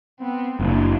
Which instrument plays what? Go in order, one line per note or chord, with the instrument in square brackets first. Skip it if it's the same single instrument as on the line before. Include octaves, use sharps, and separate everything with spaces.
[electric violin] B3 C4
[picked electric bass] F#1 [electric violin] A#3 D4